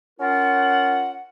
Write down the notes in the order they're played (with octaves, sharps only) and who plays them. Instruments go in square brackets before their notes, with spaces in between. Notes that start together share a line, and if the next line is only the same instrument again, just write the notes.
[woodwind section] C#4 F4 A#4 F#5